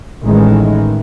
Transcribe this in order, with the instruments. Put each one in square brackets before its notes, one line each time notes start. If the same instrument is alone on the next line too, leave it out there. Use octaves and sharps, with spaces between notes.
[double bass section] A1 D#3 E3 G#3